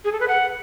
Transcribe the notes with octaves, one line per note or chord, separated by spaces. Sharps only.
G#4
A4
B4
F#5